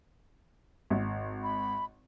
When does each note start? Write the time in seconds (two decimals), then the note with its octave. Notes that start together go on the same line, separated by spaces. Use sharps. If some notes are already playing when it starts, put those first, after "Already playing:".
0.90 G#1
1.44 B5